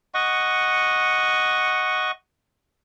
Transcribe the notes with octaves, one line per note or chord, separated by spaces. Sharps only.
D#5 F#5 C#6